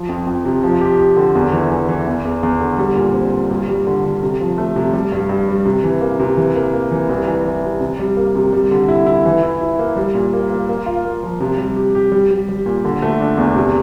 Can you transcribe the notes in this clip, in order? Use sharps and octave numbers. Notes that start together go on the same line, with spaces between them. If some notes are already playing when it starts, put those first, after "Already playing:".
Already playing: F3
F2
F2
C3
F3
G4
G4
D3
E2
E3
E3
E3
E2
E2
E2
D3
G3
A#2
C4
A#2
G2
G3
D3
D3
C3
F3
A3
C3
G3
G2
G2
G3
C3
E3
A#3
C3
E3
A#3
A#3
E3
C2
E3
E3
C3
C3
G3
A#3
C3
G3
D3
E4
E4
E3
E4
E4
A#3
G3
A#2
A#3
A#3
A#3
F4
A#3
F3
C3
G3
G4
G4
G3
G3
G3
A#2
D3
A3
D4
E2
C3